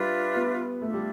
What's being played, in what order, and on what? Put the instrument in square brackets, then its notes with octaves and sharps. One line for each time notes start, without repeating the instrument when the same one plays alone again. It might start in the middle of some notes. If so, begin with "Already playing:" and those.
Already playing: [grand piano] G3 [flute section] D4 F4 B4 E5
[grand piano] B3
[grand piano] A3 [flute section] D4 F4 A4 E5
[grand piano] G3